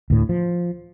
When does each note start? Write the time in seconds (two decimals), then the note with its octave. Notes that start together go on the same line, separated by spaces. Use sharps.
0.10 D2 A2
0.29 F3